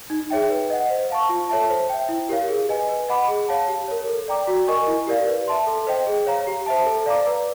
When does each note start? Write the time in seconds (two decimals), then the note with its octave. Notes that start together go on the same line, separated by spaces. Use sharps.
0.10 D#4
0.30 G#4 C#5 E5 G5
0.50 B4
0.70 D#5 F#5
0.90 C5
1.10 F5 A5 C#6
1.29 F4
1.49 A4 C#5 E5 A5
1.69 C5
1.89 E5 G5
2.09 E4
2.29 G4 A#4 C#5 F5
2.49 G#4
2.69 B4 D#5 G#5
2.89 B4
3.08 D#5 F#5 B5 D6
3.28 G#4
3.49 C#5 F5 A5
3.68 G4
3.88 A#4 C#5
4.07 A4
4.28 D5 G5 A#5 D6
4.47 F#4
4.68 A#4 D#5 G#5 C#6
4.87 E4
5.07 G4 A#4 D5 F5
5.27 B4
5.48 E5 A5 C6
5.67 A4
5.87 C5 D#5 G5
6.07 G#4
6.27 C#5 F5 A#5
6.47 G4
6.66 C5 E5 A5
6.86 A4
7.06 D5 F5 A#5 D6
7.26 B4